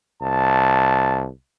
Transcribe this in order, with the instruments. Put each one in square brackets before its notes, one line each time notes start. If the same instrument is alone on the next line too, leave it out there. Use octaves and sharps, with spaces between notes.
[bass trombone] C2 [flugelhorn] A5